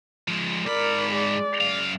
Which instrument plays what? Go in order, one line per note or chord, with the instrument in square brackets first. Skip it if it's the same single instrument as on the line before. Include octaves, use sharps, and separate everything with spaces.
[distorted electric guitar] F3 G#3
[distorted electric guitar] G#2 B5 [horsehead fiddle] A#4 D5
[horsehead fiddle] G#3 D5
[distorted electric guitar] F#2 F5